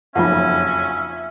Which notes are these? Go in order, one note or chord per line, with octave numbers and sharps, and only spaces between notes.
F#1 B1 F2 C#4 F4 E5 F#5